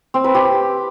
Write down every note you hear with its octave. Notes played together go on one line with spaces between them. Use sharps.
C4
B4
G4